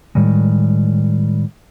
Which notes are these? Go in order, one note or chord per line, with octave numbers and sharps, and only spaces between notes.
A2 D#3 G3 G#3